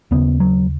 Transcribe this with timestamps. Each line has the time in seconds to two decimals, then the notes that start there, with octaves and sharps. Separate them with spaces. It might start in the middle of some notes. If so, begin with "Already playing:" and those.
0.11 D#2 C#3 B3
0.40 F#3